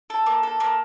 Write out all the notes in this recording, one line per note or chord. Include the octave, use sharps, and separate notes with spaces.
A4
A#3
A4
A#3